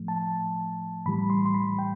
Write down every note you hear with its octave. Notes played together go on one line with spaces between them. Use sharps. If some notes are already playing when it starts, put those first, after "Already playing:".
Already playing: A2 F3 A3
A5
A2 E3 G3 B5
C6
C6
B5
G5